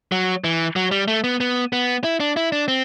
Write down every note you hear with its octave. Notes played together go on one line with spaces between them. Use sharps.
F#3
E3
F#3
G3
A3
B3
B3
B3
E4
D4
E4
D4
C4